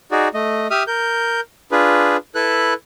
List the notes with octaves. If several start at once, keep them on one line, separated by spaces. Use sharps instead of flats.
D#4 F#4 G#4 D5
A3 D#5
G4 E5 D#6 F6
A#4 G6
D4 F4 G#4 B4
E4 A4 B4 F#6